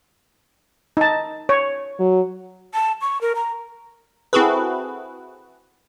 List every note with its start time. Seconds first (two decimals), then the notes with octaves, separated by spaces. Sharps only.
0.97 D#4 A5
1.49 C#5
2.00 F#3
2.74 A5
3.01 C#6
3.21 A#4
3.35 A#5
4.33 C4 E4 F#4 G#4 A4 B4